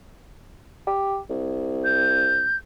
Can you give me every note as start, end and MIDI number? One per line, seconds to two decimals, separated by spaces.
0.87 1.19 67
1.30 2.48 36
1.85 2.56 91